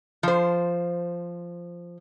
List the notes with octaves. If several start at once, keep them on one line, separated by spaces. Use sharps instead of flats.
F3 C5